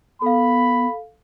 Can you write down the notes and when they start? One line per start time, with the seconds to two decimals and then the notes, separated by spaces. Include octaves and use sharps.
0.22 B3 A4 F5 B5